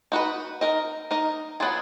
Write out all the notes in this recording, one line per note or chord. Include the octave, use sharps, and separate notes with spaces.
D#4 F#4 B4
D#4 A#4 D#5
D#4 A#4 D#5
F#3 B3 F4 G#4